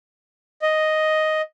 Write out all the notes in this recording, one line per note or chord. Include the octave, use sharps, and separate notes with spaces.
D#5